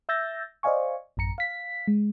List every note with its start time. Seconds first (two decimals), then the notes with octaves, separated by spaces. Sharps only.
0.09 E5 E6 G6 A6 A#6
0.63 C5 D5 D#5 F5 G#5 C#6
1.17 A1 F#2 A#5 C#7
1.38 F5 B6
1.88 G#3